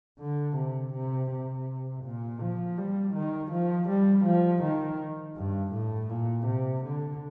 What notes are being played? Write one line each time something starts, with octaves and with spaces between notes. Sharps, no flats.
D3
C3
C3
C3
A#2
F3
G3
D#3
F3
G3
F3
D#3
G2
A2
A#2
C3
D3